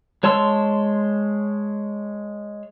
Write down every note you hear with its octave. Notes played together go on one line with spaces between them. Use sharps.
G#3 C#5 A5 C6 E6